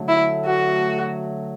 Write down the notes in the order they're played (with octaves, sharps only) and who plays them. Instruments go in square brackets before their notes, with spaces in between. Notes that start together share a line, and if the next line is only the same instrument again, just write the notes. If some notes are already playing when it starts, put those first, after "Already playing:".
Already playing: [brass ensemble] D3 F#3 A3
[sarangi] E4
F#4